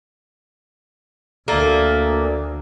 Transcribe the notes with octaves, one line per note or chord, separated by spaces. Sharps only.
D2 A#3 A4 D5 E5